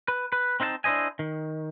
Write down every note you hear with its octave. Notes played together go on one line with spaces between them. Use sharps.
B4
B4
C4 D#4 C5 F5 A5
D4 E4 C5 D#5 G#5
D#3